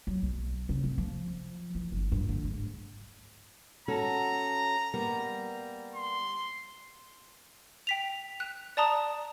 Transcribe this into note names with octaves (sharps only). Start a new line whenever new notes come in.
F#3
B1
C#3
C2
F3
E3
G1
G2
D3
G#2
C#4 F#4 A4 A#5
G3 A#3 B3
C6
G5 B6 F7
F#6
D5 A5 A#5 D#6